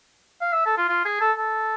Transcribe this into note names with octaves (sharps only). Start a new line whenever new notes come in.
F5
E5
A4
F4
F4
G#4
A4
A4